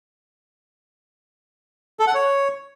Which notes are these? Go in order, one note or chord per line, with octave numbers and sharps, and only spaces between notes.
A4
F#5
C#5